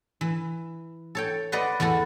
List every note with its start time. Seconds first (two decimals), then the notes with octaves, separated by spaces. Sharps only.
0.21 E3
1.15 A4 C#5 G5
1.52 B4 D5 D#5 F#5 C6
1.80 E2 E3 F#4 A4